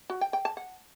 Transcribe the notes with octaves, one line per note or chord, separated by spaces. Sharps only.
F#4
G5
G5
A5
F#5